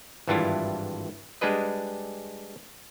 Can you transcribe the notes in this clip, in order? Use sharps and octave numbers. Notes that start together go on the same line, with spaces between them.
G#1 G2 E3 D4 E4 F4
G3 G#3 D4 G#4 B4 D#5